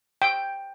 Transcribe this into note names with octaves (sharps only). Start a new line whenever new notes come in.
G5